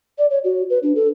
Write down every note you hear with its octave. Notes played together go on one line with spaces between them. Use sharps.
D5
C#5
F#4
B4
D4
A4